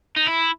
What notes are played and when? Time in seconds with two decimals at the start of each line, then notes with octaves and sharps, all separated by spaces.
0.17 D#4
0.27 E4